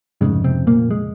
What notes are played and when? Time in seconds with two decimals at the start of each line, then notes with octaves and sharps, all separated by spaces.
0.21 F1 D#2 G#2 C#3 G#3
0.44 C3 C4
0.67 A#2 A#3
0.91 G#3